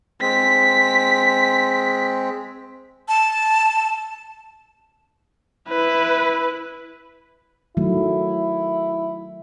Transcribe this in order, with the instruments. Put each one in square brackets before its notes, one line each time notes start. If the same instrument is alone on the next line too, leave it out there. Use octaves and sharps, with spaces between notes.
[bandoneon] G#3 C4 [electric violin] B6
[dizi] A5
[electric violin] E4 B4
[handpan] D#3 F#3 A3 [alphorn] E4